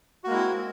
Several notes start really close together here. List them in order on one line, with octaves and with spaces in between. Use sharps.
F#4 A#3 G#3 E4 C4